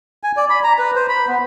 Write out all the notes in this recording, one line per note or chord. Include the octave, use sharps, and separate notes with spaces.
G#5
D5
B5
A#5
B4
C5
B5
B3